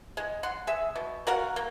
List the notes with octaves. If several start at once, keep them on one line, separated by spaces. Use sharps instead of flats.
G#3
F#5 C6
G#4 E5
B2
F#4 A#4 F5 F#5
A#3